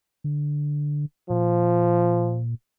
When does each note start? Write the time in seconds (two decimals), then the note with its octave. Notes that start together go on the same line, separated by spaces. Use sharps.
0.24 D3
1.30 A#2 F3